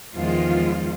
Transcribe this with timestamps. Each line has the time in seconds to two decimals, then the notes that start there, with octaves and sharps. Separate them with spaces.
0.16 E2 D#3 F3 G#3 F4